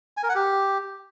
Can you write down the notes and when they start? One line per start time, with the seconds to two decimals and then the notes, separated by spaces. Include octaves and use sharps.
0.17 G#5
0.23 A#4
0.29 F#5
0.35 G4